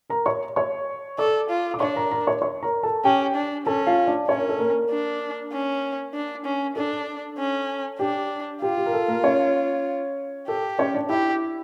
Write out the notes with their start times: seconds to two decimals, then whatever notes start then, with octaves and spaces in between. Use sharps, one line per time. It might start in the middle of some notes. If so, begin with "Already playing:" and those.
0.10 A#4 A#5
0.26 C#5 C#6
0.56 C#5 C#6
1.18 A4 D5 D6
1.50 F4
1.74 D6
1.80 D4 C#5 C#6
1.96 A#4 A#5
2.11 A#4 A#5
2.27 C#5 C#6
2.42 C#5 C#6
2.63 A#4 A#5
2.83 A4 A5
3.04 C#4 G4 G5
3.35 D4
3.66 C#4 A4 A5
3.87 F4 F5
4.07 D4 D5
4.28 C#4 C#5
4.38 A#4
4.49 A4
4.59 A#3 A#4
4.90 D4
5.52 C#4
6.14 D4
6.45 C#4
6.76 D4 A4
7.38 C#4
7.99 D4 G4
8.62 F4 G4
8.78 G4
8.86 A#4
8.93 A4
9.08 A#3 A#4
9.24 C#4 C#5
10.48 G4 A4
10.78 C#4 C#5
10.94 D4 D5
11.10 E4 G4 E5